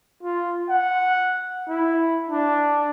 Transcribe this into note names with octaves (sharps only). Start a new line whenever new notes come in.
F4
F#5
E4
D4